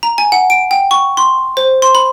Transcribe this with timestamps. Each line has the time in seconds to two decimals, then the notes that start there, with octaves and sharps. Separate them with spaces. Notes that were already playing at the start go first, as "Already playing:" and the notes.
0.03 A#5
0.18 G#5
0.32 F#5
0.50 D7
0.71 G5
0.91 C#6
1.17 C6
1.57 C5
1.82 C6
1.95 B5